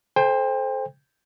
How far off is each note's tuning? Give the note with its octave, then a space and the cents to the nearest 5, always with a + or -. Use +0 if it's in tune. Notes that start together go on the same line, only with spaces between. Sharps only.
A4 -20 C5 +0 G5 +30